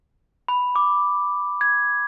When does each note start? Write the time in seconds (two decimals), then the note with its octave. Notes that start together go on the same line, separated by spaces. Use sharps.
0.48 B5
0.76 D6
1.61 G#6